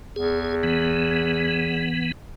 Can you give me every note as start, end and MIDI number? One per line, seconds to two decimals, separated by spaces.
0.16 1.92 40
0.16 0.55 68
0.63 2.12 52
0.63 2.12 59